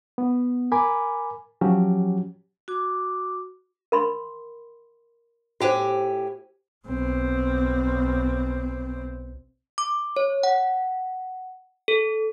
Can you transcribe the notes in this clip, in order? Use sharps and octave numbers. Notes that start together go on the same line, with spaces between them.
B3
A#4 G#5 B5 D6
F3 F#3 C#4 F#4 G4
F#4 D6
A#4 B5 C6
A2 F#4 G4 C5 G#5
B1 C4
D6
C#5
F#5
A4